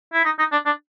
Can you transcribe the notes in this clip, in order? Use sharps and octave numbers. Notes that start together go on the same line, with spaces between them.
E4
D#4
D#4
D4
D4